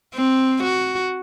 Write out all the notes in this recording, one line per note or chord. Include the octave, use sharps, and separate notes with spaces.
C4
F#4